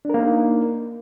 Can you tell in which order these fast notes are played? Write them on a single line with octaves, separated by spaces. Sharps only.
D4 A#4 A#3 D#4